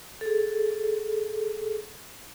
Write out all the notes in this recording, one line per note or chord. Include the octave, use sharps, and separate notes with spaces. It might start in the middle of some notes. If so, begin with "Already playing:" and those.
G#4 A4